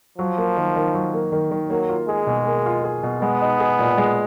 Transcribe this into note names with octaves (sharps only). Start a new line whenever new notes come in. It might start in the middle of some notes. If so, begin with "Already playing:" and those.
F3 F#3
A#3
D#3
D#3
F#3
A#3
D#3
D#3
F#3 A#3
F4
G#3 G#4
B2
A#3
F4
G#4
B2
G#3 B3
D#4
G#4
A#2
G#3